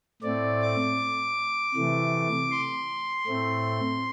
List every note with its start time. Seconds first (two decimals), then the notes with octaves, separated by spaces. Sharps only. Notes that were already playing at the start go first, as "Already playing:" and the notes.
0.22 A2 A3 C4 D5
0.61 D6
1.75 C3 E3 A3
2.51 C6
3.27 A2 A3 C4